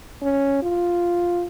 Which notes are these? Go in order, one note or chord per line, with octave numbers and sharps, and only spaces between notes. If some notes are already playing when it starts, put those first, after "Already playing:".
C#4
F4